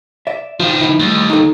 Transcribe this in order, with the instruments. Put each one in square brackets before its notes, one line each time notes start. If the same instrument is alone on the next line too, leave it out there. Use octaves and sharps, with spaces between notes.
[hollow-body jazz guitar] D5 E5
[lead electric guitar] D#3 F3 [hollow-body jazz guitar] F4
[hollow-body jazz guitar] D#4 E4
[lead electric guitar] D#2 [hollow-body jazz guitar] A2 G3
[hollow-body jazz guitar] D#4 A4